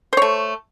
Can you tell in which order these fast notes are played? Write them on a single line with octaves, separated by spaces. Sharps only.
C5 C#5 A3